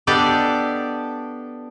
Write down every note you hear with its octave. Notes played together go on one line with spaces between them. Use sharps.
B3 D4 G4 A4 D5 D#5